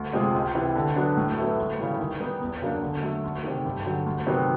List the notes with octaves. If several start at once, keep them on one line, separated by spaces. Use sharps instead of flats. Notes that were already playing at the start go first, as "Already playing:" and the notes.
Already playing: D2
C3 F3 G#3
C#2
C3 E3
D3
F#3 B3 D4
A2
F#3 B3 E4 A4
D2
C#3 E3 G3
D#3
G3 B3 D#4
E2
C#3 F#3 A#3 D4
D3
F#3 A3
D2
C3 D#3
G2
D3 F#3
D2
C3 D#3 F#3 B3